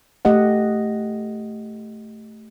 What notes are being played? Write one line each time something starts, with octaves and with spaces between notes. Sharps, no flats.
A3 G4 D#5 F#5